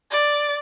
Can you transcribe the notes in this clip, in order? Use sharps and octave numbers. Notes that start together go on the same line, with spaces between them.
D5